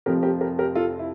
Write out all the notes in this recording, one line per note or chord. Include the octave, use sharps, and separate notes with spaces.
F1 F2 C3 F3 G4 A#4
G4 A#4
G4 A#4
G4 A#4
F4 A4
E4